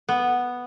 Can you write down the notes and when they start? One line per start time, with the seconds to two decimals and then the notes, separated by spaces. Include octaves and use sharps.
0.09 B3